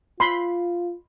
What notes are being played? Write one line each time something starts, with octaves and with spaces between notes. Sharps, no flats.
F4 B5 C6